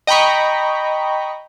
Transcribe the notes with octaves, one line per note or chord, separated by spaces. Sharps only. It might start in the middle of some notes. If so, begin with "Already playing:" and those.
D#5 G5 A#5 B5 C#6